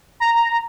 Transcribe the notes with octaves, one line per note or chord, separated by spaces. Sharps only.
A#5